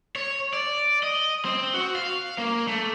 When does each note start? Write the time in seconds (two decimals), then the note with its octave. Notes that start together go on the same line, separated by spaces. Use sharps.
0.16 C#5
0.54 D5
1.03 D#5
1.45 C4
1.74 F#4
1.95 F5
2.38 A#3
2.68 A3